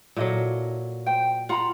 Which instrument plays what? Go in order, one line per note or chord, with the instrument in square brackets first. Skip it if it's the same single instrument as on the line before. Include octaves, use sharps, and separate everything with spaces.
[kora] A#2 F#3 [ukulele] E4 A4 D#5
[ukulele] C5 G5
[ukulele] F4 A#5 B5 [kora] F#5